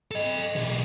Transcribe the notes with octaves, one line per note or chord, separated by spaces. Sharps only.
A4 D#5
B1 G#4